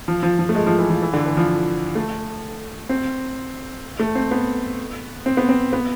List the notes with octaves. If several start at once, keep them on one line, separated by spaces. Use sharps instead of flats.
F3
F3
F3
A3
G#3
F3
E3
F3
E3
D3
E3
F3
A3
C4
A3
C4
B3
C4
B3
C4
B3